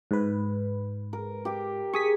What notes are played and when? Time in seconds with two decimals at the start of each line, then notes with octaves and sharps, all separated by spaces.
0.11 G#2 B4
1.13 A#4
1.45 G4 G5
1.93 G#4 C#6 D#6 B6